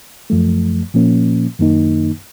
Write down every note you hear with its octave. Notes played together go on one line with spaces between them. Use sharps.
F#2 F3 A3
A#2 F3 A#3 C#4
F#2 D#3 A#3 D#4